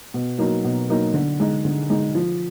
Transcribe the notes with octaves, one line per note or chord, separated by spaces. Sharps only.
B2
F#3 A#3 D#4
B2
F#3 A#3 D#4
D3
G#3 D#4
D3
G#3 D#4
F3